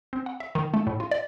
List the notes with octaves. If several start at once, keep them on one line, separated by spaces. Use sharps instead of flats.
C4
F#5
E5
D#3
A3
A2
F4
D5